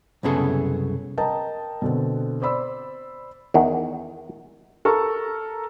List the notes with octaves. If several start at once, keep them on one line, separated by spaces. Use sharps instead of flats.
C2 F#2 C#3 B3 G#4 A4
A#4 D#5 G5 A5 A#5
B2 D3 C4
C5 D5 B5 E6
E2 D#3
A4 A#4 C#6